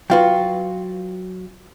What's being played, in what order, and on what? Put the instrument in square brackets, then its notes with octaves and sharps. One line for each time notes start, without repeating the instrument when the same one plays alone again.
[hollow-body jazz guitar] F#3 F4 F#4 [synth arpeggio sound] B4 F5 G5